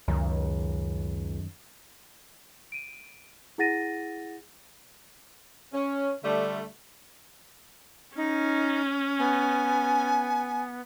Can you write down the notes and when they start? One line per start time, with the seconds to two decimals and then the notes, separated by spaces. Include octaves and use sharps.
0.08 C#2 F#2 D#3
2.72 D7 D#7
3.58 E4 G#4 F#5 A6 A#6 D#7
5.73 C#4
6.24 D3 G3 A3
8.17 C#4 D#4
9.19 B3 G#5